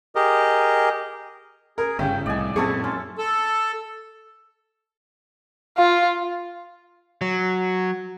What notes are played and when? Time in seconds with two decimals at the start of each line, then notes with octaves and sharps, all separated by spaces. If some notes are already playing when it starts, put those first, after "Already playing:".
0.15 G4 G#4 A#4 D#5
1.78 G#4 A#4
1.99 G1 C#3 C#4 E5 G5
2.26 C2 A2 D5 D#5 G#5
2.56 F#2 A#2 C4 E4 G#4 A4 A5 C#6
2.84 C#4 C6
3.18 A4
5.78 F4 F5
7.21 F#3